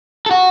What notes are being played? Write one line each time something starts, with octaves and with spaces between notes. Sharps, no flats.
A4
F#4